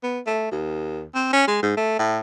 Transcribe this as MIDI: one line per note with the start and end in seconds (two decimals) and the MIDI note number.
0.03 0.20 59
0.26 0.50 57
0.52 1.04 39
1.14 1.28 60
1.33 1.43 61
1.48 1.60 56
1.63 1.76 44
1.77 1.97 57
1.99 2.20 45